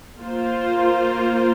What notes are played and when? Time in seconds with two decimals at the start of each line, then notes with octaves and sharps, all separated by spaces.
0.19 A#3 F4 C5